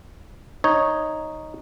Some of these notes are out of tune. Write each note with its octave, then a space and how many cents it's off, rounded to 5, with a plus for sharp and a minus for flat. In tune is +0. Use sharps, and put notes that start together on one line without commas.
D#4 +0 C#5 +0